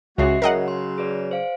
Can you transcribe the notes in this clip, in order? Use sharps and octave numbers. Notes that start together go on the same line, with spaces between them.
C#2 C#3 G#3 F#4 E5 C7
C#3 F#3 A#4 D#5 F#5
C6
G#4 B4 D5
C5 F5 D7